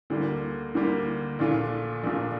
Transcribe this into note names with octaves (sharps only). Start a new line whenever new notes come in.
D2 D3 G3 A#3
D2 D3 G3 A#3
A#1 A#2 A3 D4 F4
A#1 A#2 A3 D4 F4